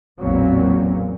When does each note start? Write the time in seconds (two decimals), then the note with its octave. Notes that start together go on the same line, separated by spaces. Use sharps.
0.20 A1 E2 A#2 F#3 A#3 C4